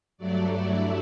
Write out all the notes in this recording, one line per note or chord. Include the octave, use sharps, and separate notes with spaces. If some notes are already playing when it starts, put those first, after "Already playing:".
G2 F#3 A3 D5
E4